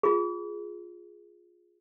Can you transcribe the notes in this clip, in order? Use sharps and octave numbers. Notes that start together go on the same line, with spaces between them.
F4 G#4